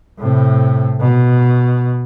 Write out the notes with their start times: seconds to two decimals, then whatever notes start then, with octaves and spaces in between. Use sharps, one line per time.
0.19 A2 C3
1.00 B2